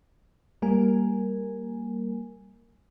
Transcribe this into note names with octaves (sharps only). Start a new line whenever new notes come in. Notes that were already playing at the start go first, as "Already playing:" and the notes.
G3 A#3 A#4 G#5